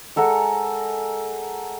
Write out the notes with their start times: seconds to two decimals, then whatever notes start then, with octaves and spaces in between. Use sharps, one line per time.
0.16 G#3 A4 A#4 F#5